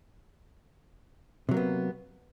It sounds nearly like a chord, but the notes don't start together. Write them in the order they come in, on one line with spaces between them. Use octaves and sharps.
C3 F#3 A#3 B3